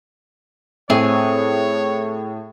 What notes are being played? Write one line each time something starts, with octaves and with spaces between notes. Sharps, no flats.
A2 C4 G#4 C#5 G#5